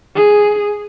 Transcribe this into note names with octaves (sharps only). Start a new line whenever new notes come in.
G#4